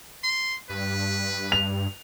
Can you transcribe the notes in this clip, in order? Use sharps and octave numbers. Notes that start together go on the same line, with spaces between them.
C6
G2 B4
F7